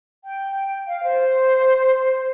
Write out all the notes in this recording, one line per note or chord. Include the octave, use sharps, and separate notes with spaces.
G5
F5
C5